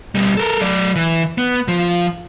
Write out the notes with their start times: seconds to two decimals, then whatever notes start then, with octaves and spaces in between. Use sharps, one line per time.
0.15 B2 G3
0.37 A4 A#4
0.61 F#3 D5
0.96 E3
1.38 B3
1.68 F3